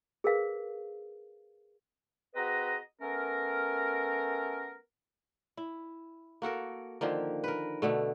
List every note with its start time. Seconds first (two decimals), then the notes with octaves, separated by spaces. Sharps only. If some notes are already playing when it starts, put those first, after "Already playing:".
0.24 G#4 A#4 B4 F5
2.35 C4 F#4 G#4 B4 D#5 A#5
3.01 A3 B3 C#4 A#4
5.57 E4
6.42 A#3 F#4 A4 A#4
7.01 D3 D#3 F3 A#3
7.44 A#4 B4
7.82 B2 D3 A3